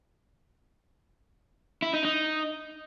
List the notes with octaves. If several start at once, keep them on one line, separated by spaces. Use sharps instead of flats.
E4
D#4
D#4